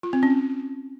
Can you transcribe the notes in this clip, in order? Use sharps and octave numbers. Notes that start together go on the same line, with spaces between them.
F4
C4
C#4